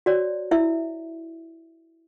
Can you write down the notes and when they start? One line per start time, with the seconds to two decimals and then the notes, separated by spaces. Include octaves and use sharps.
0.06 F#4 C#5 D5
0.51 E4 E5